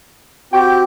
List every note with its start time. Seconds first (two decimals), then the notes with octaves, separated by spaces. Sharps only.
0.53 C4 F#4 G4 G5 C#6 G6